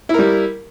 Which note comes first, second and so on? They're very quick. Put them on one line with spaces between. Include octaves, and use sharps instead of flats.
E4 A#4 G3